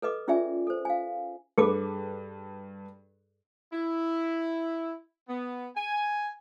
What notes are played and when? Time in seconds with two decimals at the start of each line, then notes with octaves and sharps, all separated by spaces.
0.02 A4 B4 D#5 D6
0.28 C#4 F4 G#4 D5 E5 G#5
0.67 A4 C5
0.85 F5 G#5
1.58 G2 G#4 A4 B4 D6
3.73 E4
5.29 B3
5.76 G#5